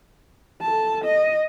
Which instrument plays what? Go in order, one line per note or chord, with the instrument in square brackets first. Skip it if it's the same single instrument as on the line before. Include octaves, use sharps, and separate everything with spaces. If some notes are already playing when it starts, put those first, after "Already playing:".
[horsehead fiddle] A4 A5
D#5